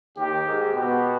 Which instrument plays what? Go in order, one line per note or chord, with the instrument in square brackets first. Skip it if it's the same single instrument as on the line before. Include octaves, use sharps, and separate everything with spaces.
[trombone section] D#2 D#3 [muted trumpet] G4
[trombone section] G#2 G#3
[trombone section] B2 B3 [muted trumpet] G4